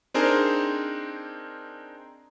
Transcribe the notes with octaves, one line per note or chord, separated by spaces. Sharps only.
C4 D4 D#4 G#4 A#4 C5